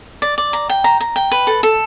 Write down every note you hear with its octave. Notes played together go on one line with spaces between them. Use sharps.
D5
D5
A#5
G5
A#5
A#5
G5
B4
A4
A4